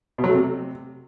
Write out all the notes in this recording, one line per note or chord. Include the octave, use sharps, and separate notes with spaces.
B2
F#3
A3
C3